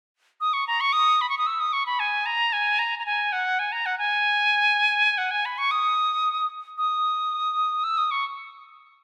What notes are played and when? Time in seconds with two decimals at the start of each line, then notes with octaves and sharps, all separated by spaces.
0.41 D#6
0.53 C#6
0.67 A#5
0.81 C#6
0.93 D#6
1.21 B5
1.29 C#6
1.38 D#6
1.46 E6
1.60 D#6
1.73 C#6
1.86 B5
2.00 G#5
2.26 A#5
2.53 G#5
2.79 A#5
2.99 A#5
3.06 G#5
3.32 F#5
3.59 G#5
3.72 A#5
3.86 F#5
3.98 G#5
5.18 F#5
5.31 G#5
5.45 B5
5.58 C#6
5.71 D#6
6.78 D#6
7.84 E6
7.97 D#6
8.11 C#6